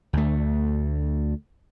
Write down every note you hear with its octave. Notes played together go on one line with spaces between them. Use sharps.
D2 A3